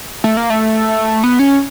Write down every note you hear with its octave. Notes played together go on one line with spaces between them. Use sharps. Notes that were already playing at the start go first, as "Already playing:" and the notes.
A3
A#3
A3
B3
C#4